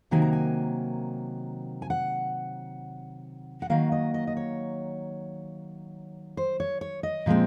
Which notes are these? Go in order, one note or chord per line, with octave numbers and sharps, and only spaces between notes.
C3 D#3 F#3 A#3 G#5
A#5
G#5
G#5
F#5
F#5
D#3 F#3 A#3 F5
D#5
D#5
D#5
C#5
C5
C#5
C#5
D#5
A#2 F3 G#3 C4